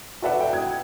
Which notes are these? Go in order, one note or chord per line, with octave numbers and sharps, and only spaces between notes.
F#4 A4 B4 D5 E5 F#5
G5
D#6 G#6